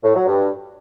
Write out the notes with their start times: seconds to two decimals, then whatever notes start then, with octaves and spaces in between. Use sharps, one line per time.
0.04 A2
0.15 F#3
0.27 G2